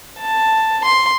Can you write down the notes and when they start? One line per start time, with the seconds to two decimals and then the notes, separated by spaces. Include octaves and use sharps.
0.20 A5
0.84 C6